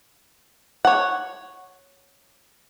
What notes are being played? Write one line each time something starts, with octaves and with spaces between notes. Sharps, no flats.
C#5 F#5